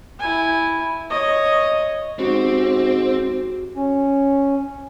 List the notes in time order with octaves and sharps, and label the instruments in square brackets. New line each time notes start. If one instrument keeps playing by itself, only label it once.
[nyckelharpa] E4 G#5
C#5 D#5
[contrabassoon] G#2 [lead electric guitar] C4 [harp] F#4 G4
[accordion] C#4